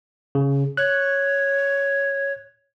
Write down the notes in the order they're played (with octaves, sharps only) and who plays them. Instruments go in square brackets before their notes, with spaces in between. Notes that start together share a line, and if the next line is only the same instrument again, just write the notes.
[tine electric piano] C#3
[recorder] C#5 [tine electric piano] F#6